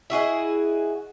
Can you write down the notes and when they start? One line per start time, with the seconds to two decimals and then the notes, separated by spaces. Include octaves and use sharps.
0.10 E4 F#4 G#4 D#5